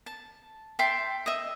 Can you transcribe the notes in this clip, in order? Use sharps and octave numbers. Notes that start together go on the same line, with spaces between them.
A5
E5 G5 A5 C6
D#5 E5